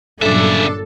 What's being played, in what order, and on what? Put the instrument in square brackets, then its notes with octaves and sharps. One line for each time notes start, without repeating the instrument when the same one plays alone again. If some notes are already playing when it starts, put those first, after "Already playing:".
[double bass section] G1 A#2 F#3 [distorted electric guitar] C#3 E5 [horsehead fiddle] D4 [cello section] A4